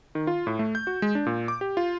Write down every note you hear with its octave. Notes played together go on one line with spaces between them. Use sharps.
D#3
F4
A2
A3
G6
F#4
G#3
D4
A#2
D6
G4
F4